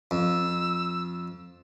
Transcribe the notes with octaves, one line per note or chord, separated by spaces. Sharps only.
F2 E6